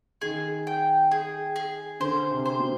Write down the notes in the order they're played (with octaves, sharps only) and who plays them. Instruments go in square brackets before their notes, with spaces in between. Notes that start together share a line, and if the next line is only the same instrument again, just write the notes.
[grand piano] D#3 [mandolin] G#4
[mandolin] G5
G#4
G#4
[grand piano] D3 [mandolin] C5
[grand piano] C3
[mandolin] C5
[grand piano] B2